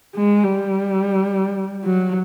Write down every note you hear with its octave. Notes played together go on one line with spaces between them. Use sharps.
G#3
G3
F#3